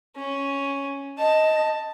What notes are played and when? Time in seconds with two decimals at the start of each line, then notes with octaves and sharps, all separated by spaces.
0.16 C#4
1.18 D#5 A5